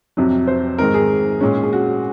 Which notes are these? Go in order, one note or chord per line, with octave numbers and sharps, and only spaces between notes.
F2 C3 F#3
C5
G#2 D#3 G#3 C4 A#4
G#4
A#2 G#3 C#4
G#4
F#4